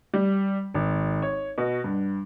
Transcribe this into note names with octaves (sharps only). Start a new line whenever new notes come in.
G3
G#1
C#5
B2
G2